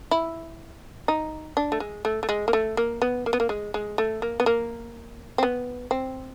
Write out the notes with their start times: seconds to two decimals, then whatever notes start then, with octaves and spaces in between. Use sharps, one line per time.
0.11 E4
1.08 D#4
1.57 D4
1.72 A3
1.80 G#3
2.05 A3
2.23 A3
2.29 G#3
2.48 A#3
2.53 A3
2.77 A#3
3.02 B3
3.26 A#3
3.33 B3
3.40 A#3
3.49 G#3
3.74 G#3
3.98 A3
4.22 A#3
4.40 B3
4.46 A#3
5.38 C4
5.43 B3
5.91 C4